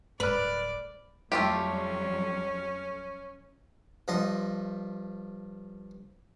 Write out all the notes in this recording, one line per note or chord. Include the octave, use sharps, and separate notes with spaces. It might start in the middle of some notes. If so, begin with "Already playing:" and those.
D1 B4 D5 B5 F6
F2 F#3 G3 A3 C#4 F4 G4
G2 F3 D#5 C6